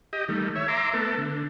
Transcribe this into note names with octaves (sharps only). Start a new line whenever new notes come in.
G4 D#5
D#3 G3 A3
C#5 E5
E5 A#5 C6 D6
A3 B3 A4
D3